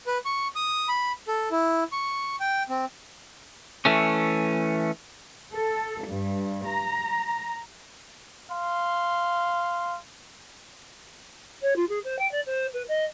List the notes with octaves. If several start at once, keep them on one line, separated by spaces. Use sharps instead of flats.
B4
C#6
D#6
B5
A4
E4
C#6
G5
C4
E3 A3 C#4
A4
G2
A#5
F5 C6
C#5
F4
G#4
C5
G5
D5
C5
B4
D#5